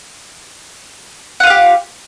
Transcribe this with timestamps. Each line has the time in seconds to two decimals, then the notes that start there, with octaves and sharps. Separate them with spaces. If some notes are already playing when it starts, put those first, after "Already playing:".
1.40 F#5
1.43 F4
1.47 F5
1.50 G4